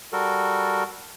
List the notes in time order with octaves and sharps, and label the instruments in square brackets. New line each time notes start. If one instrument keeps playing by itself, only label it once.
[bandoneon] G3 F#4 A4 A#4